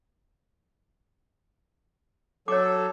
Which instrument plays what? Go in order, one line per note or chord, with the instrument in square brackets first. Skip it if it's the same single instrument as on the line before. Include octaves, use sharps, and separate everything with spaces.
[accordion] F#3 A4 [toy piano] C#5 D6